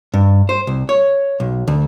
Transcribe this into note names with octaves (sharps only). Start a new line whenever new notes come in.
G2
C5
C2
C#5
B1
D2